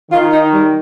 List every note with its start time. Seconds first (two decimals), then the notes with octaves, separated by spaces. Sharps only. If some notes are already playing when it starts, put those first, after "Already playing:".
0.11 D#3 F4
0.32 D#4
0.53 G3